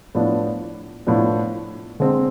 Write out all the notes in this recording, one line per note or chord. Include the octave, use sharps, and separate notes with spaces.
A2 F3 B3 D4
A2 F3 B3 D4
D3 G#3 C4